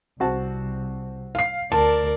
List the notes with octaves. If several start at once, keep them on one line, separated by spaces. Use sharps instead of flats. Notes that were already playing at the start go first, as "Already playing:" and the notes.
C2 C4 F#4 A5
F5 C7
D2 A#4 D5 A5